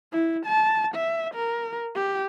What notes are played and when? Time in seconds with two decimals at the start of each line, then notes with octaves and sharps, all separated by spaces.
0.12 E4
0.46 A5
0.95 E5
1.35 A#4
1.95 G4